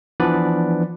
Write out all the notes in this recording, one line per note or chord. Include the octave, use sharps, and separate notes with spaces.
E3 F3 B3 D4 B4 D5